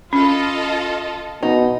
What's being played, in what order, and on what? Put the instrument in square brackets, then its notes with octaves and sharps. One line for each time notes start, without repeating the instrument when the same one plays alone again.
[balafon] C#4 [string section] F4 A4 D#5
[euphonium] B2 [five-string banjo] D#4